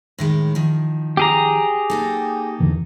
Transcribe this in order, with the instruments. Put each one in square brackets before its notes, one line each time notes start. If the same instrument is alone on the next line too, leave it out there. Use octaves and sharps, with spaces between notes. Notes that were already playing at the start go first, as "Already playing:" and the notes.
[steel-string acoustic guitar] A2 D#3 G#3
D#3 F3
[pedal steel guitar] G4 G#4 A#5
[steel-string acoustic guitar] A#3 D#4 A4
[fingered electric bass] E2 D3 E3